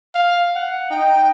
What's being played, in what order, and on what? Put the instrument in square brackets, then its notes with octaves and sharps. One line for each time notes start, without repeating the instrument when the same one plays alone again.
[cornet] F5
F#5
[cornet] D#4 [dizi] G5